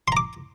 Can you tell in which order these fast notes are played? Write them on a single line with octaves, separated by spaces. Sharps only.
C6 A#5 D6